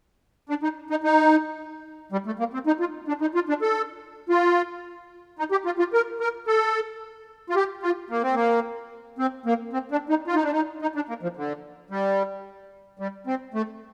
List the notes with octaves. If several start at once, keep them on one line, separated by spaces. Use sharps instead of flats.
D4
D#4
D#4
D#4
G3
A3
A#3
C4
D#4
F4
D4
D#4
F4
D4
A4
F4
D#4
G4
F4
F4
A#4
A#4
A4
F4
G4
F4
A#3
C4
A#3
C4
A#3
C4
D4
D#4
F4
D#4
D4
D#4
D#4
D4
A#3
F3
D3
G3
G3
C4
A3